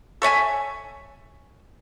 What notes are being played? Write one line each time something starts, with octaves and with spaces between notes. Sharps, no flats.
A4 C#5 E5 G#5